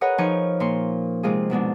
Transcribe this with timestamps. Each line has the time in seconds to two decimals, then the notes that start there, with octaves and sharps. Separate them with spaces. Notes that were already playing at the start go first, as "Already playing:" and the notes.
0.01 G#4 A#4 B4 C#5 D#5 F#5
0.18 F3 D#4 F4 G#5 C#6
0.60 A#2 C6 C#6
1.23 C3 G#3 F4 G#4
1.50 G#2 B2 G#3 D4